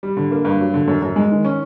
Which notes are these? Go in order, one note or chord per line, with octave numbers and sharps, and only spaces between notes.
G3
D3
A#3
G2
F#3
D3
F#2
F#2
G#3
D#3
C#4